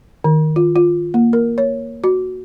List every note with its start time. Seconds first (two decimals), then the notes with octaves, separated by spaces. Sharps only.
0.24 D#3
0.56 F4
0.76 F4
1.14 A#3
1.33 A#4
1.58 C#5
2.04 F#4